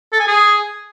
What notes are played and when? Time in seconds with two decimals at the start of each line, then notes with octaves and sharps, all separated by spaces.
0.12 A4
0.20 G#5
0.27 G#4